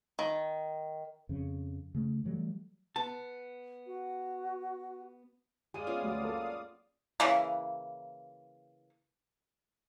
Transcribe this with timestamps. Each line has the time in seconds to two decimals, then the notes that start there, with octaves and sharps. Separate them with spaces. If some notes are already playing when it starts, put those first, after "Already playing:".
0.19 D#3
1.29 F2 C#3
1.95 C#3 A3
2.24 E3 F#3 G3 A3
2.96 B3 A5
3.87 F#4
5.74 G#3 G#4 D5 F5 D#6 D#7
5.87 B3 C#4 F4
6.02 D2 F#3
6.23 F#3 A#3 A4
7.20 C#3 E3 A#3